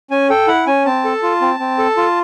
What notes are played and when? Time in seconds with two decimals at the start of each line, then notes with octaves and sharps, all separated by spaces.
0.11 C#4 G#5
0.30 A4 G5
0.48 E4 F#5
0.67 C#4 G#5
0.86 C4 A5
1.05 A4
1.23 F4
1.41 C4
1.60 C4
1.78 A4
1.97 F4